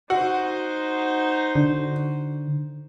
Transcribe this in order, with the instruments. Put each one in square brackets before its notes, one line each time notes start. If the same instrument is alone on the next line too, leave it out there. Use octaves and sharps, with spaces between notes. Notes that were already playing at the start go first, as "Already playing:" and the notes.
[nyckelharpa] D#4 C5 [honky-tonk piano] F#4
[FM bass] D3